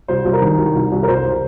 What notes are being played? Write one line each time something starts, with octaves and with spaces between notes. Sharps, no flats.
C2 C5
C2
A#4
D#3
C2
C2
C2
A#4
C2 C5